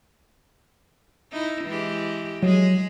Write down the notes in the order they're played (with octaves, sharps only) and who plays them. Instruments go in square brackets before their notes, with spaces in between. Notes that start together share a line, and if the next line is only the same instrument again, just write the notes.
[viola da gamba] D#4 E4
E3 G#3 G4
[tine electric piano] F#3 [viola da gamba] G#3 G#4